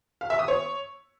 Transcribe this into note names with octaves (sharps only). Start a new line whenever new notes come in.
F5
E5
D#6
C#5